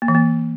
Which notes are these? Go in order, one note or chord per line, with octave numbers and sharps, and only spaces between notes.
A#3
E3
A#3